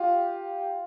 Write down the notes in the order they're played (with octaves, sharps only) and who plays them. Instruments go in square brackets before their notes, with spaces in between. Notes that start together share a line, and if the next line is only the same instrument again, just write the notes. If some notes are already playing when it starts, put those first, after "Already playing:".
Already playing: [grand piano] F4 [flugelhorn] G4